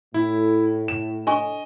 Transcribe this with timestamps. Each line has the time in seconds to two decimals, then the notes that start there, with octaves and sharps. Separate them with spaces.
0.14 A2 E4
0.88 E7
1.27 D4 D#5 G#5 C#6